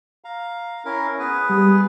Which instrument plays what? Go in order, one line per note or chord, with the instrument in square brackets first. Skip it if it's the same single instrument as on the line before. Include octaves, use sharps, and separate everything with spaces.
[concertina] F5 A#5
C#4 E4 A#4
B3 G#4 B4
[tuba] G3